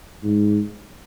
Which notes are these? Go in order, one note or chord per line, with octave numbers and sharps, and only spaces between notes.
G#2